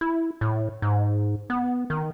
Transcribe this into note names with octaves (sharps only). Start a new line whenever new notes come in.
E4
A2
G#2
B3
D#3